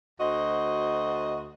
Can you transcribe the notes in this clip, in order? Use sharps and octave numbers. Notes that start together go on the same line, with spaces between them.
D2 F#4 C5 D#5